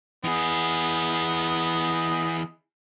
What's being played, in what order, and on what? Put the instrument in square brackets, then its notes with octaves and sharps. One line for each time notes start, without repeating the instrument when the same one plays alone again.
[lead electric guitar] E3 G#4 [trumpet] B3 [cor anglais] D#5